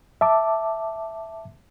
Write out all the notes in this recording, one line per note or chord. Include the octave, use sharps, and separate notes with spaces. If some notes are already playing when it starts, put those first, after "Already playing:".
E5 A5 D6